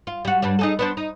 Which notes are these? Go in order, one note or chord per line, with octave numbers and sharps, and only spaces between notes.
F4
G3 F#4
G2 G3 D4
D#4 G#4 A4
B3 D4 C5
D#4